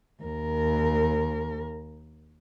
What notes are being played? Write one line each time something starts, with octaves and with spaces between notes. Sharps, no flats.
D#2 A#4